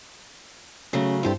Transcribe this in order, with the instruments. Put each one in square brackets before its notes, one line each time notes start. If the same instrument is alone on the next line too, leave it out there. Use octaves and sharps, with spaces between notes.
[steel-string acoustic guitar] C#3 F#3 A3 [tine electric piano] C#4
[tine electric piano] G2 E4 [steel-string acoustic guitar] C4 G4 A4